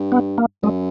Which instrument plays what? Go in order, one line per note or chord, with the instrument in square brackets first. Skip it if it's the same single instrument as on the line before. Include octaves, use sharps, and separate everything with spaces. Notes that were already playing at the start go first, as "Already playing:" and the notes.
Already playing: [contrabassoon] G2
[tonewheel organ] B3
A#3
[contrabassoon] F#2 [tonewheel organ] G#3